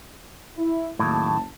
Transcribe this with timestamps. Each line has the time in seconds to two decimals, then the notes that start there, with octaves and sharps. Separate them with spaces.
0.57 E4
0.99 F#1 D#2 A2 A3 A5